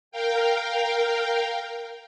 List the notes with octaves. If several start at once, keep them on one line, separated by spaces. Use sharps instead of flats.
A#4 F5 G5